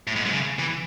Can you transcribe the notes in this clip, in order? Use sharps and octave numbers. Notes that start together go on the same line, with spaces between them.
A2
G#2
F#2
C#3
E3